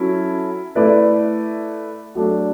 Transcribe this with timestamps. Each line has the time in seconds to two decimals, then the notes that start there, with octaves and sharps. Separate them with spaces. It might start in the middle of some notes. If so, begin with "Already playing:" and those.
Already playing: F#3 C#4 E4 A4
0.75 A3 E4 B4 D5
2.15 F#3 A3 D4